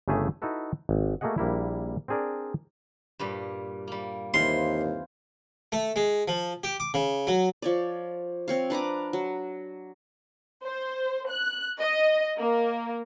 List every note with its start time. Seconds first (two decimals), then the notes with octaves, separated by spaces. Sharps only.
0.08 G1 C#3 A3 G4 G#4 E5
0.42 D#4 E4 F#4 A4 B4
0.89 G#1
1.21 A3 A#3 F#4 G#4 D#5 F#5
1.38 A#1 G3 A#3 E4
2.08 C4 D4 G#4 A#4 D5
3.19 G2 A#2 G3
3.88 G3 A#3
4.34 D#2 E3 C4 F4 C6
5.72 A3
5.96 G#3
6.28 F3
6.64 G4
6.80 D6
6.94 C#3
7.27 F#3
7.62 F3 C#5 D5
8.48 C4 C#5 F5
8.70 D4 B4 A#5 D6
9.13 F#3
10.64 C5
11.30 F#6
11.80 D#5
12.38 A#3